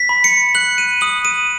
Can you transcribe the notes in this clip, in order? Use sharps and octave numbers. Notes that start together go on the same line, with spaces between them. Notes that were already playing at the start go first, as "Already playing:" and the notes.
Already playing: B6
B5
C#7
F#6 F#7
D#7
D#6 F#7
D#7